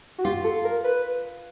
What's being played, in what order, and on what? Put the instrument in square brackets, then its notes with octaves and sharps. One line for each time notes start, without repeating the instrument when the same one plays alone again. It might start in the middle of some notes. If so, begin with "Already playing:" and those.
[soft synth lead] F#4
[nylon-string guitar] F4 [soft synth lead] G4
[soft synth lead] A4
A#4
B4